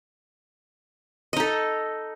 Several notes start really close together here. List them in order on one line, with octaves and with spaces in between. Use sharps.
D#5 D#4 A4